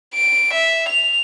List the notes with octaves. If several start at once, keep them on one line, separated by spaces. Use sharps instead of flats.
D7
E5
F7